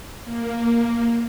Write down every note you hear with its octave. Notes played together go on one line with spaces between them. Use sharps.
A#3